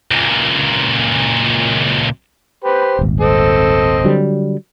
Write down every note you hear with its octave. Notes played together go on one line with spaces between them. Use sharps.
C#2 A#2
G4 B4 C5
D#1 G#1
C4 A4 D#5
D3 F#3 G3